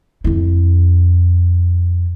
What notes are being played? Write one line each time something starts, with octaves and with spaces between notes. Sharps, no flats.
F2 E4